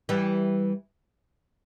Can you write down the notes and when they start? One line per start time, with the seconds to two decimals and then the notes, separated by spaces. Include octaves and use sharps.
0.09 E3 G3